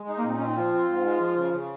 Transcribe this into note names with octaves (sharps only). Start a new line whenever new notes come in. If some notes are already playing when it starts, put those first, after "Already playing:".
Already playing: G#3
D#4
A#3
A#2 C4
C4 C#4
D#4
F3 F4
C4
G#2
G#3
F3
C#3
C#3